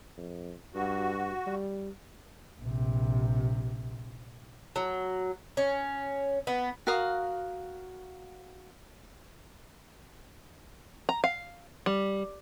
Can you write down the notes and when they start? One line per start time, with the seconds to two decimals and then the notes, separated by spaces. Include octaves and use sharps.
0.17 F2
0.74 G2 F#4
1.46 G3
2.61 A#1 C3
4.76 F#3
5.57 C#4
6.47 B3
6.87 F#4 A#4 F5 D#6
11.09 A#5
11.24 F5
11.86 G3